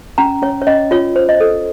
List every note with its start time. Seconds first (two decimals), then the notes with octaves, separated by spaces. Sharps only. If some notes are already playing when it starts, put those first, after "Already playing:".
0.18 C#4 A#5
0.42 C#4 C#5
0.62 C#5
0.67 C#4 D#5
0.91 F4 C#5
1.16 C5
1.29 D#5
1.41 A4